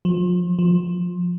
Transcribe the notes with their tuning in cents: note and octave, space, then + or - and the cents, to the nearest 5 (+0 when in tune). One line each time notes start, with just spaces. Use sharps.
F3 +35
F3 +15